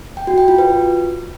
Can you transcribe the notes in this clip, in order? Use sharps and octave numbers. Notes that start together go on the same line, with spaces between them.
G5
F#4
G5
F4
B4